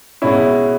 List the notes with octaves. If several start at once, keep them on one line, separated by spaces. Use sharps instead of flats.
B2 G#3 C#4 E4